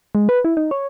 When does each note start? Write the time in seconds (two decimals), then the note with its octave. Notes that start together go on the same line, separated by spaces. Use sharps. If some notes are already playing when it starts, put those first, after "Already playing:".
0.15 G#3
0.29 B4
0.45 E4
0.57 D#4
0.71 C#5